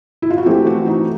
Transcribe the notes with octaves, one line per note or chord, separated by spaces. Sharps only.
E4
F4
F#4
E3 A3 C4 G4
F#4
D#4